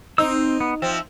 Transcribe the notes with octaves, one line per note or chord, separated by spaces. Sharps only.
C4 D#4 C5 E6
B3
F3 C4 E5